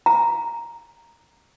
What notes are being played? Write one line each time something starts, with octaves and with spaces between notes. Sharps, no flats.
A#5